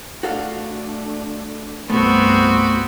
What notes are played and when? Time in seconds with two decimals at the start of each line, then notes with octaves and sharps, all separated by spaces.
0.23 A3 D4 F#4 A4 F5
1.90 C2 G2 A3 B3 C4 F#4